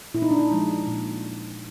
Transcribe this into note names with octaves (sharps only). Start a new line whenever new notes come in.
A#2 E4
D#4
D4
D#4
F3 G#3
A#2